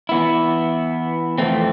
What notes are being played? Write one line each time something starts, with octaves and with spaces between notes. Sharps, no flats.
E3 B3 E4
F2 E3 A3 C4